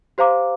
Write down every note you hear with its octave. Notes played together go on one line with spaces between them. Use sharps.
G4 C5 F5 A#5 D6